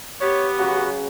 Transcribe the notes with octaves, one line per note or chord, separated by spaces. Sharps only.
B3 G4 C#5
C#3 F#3 F#4 B4